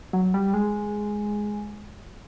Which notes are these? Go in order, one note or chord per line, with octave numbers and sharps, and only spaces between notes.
F#3
G3
G#3